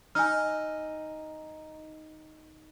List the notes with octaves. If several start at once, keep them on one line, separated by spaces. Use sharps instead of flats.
D#4 G#5 E6 F6